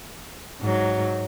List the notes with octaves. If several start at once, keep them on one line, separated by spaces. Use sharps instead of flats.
G#2 F#3